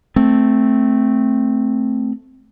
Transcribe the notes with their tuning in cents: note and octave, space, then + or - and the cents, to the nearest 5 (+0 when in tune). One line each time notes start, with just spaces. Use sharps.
A3 +0 C4 +0